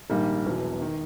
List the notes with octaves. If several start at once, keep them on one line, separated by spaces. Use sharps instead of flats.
A#1 G#2 D#3 G3 A#3
E1 E2 B2 F#3
D#3